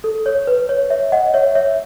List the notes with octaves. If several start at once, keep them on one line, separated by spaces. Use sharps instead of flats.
A4
C#5
B4
C#5
C#5 E5
D#5 F#5
C#5 E5
C#5 E5